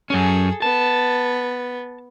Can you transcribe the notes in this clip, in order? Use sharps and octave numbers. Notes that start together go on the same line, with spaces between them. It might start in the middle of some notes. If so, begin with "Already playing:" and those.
F#2 C#4 G#4 A4
B3 A5